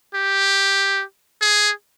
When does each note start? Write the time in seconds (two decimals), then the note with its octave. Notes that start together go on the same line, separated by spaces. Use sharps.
0.14 G4
1.41 G#4